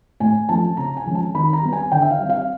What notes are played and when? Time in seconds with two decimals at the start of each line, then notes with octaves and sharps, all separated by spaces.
0.20 A2 G#5
0.49 F3 A3 C#4 A5
0.77 C#3 A#5
0.97 G#5
1.06 F3 G#3 C#4
1.15 A5
1.35 D#3 B5
1.53 A#5
1.63 G3 B3
1.73 G#5
1.92 D3 G5
2.02 E5
2.11 F5
2.20 G3 C4
2.29 F5